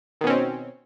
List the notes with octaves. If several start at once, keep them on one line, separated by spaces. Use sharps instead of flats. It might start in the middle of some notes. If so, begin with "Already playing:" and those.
B2 D#3 C4 C#4